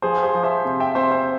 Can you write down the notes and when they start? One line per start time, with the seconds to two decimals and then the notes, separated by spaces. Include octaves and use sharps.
0.02 F3 G#4 C5
0.23 G#4 C5
0.34 F3
0.43 C5 E5
0.65 C3
0.80 E5 G5
0.95 C3 C5 E5
1.11 C5 E5